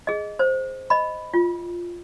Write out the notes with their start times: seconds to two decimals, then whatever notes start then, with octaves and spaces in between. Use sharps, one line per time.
0.07 G#4 D#5
0.39 C5
0.90 D#5 B5
1.34 F4